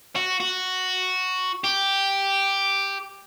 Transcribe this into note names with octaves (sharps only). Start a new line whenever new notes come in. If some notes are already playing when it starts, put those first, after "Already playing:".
F#4
F#4
G4